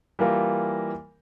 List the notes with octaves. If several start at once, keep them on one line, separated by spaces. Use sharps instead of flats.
E3 G3 A#3 F4 A#4